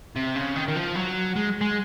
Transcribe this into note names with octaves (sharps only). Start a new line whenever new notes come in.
C3
C#3
D#3
D#3
F3
F#3
G#3
G#3